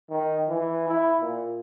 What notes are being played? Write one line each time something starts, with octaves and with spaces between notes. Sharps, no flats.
D#3
E3
E4
A#2